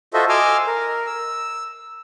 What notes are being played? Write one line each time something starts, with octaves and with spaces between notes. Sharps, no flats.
F4 F#4 A4 C5 D#5 E5
D#5 G#5 C6 D6 E6 F6
A#4
E6